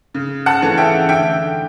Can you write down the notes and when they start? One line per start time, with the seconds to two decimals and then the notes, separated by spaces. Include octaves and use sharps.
0.14 C#3
0.46 F#5 A5
0.62 E3 A3 C#4
0.77 E5 G5
1.09 D3 E5 G5